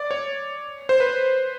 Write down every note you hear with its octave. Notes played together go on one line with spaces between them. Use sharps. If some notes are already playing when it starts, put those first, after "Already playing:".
Already playing: D5
C#5
C5
B4